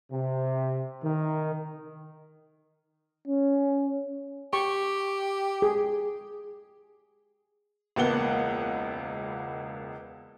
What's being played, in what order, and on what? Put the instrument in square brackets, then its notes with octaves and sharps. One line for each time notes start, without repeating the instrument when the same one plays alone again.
[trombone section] C3
D#3
[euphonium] C#4
[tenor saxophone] G4 [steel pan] C#6
[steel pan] G#4
[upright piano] E1 C#2 A#3 B3 F#5 G7